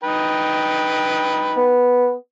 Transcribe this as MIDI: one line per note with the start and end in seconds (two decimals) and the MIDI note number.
0.03 1.75 63
0.03 1.75 71
0.03 1.75 79
1.57 2.13 59